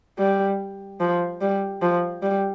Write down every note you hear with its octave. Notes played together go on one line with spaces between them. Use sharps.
G3
F3
G3
F3
G3